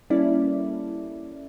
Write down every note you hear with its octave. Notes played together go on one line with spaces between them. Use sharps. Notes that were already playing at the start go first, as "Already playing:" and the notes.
G3 A#3 C#4 E4 A4 D5